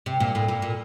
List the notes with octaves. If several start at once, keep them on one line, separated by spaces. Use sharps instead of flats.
C3
A#2
A2
A#2
A#2